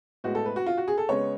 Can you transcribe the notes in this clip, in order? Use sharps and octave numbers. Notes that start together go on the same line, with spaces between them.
A2 G#3 B3 F#4
A4
B4
F#4
F4
F#4
G#4
A4
C#3 G#3 B3 C#5